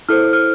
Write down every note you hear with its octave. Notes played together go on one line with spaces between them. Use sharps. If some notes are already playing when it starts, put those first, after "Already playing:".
E4 A4 C5 F6
F6